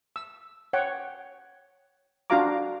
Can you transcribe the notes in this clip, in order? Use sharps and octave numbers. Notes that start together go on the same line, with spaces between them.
E6
C#5 F#5 G5
D4 F4 F#4 F5 A#5 D6